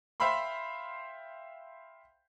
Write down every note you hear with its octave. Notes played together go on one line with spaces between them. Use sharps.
C5 E5 F5 G5 B5 C6